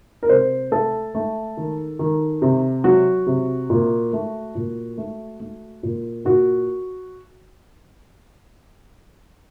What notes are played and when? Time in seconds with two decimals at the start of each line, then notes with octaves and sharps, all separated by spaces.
0.23 A#4
0.29 C3 C5
0.71 A3 A4
1.15 A3
1.57 D#3
1.99 D#3
2.42 C3
2.84 F#3 F#4
3.27 C3
3.70 A#2
4.13 A3
4.55 A#2
4.98 A3
5.40 A3
5.83 A#2
6.25 A#2 F#4